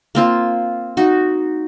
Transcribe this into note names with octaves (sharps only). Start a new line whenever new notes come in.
A#3 C4 F4
D#4 F#4